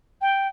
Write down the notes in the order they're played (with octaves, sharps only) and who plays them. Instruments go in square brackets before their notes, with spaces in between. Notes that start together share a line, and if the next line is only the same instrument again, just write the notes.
[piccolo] G5